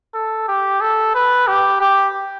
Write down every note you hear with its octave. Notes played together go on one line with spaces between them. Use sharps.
A4
G4
A4
B4
G4
G4